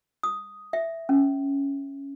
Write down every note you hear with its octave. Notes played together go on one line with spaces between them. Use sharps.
D#6
E5
C#4